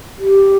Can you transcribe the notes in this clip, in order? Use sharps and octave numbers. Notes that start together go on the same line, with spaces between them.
G4